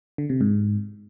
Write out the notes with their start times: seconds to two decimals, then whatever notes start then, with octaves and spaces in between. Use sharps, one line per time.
0.18 D3
0.30 C3
0.41 G#2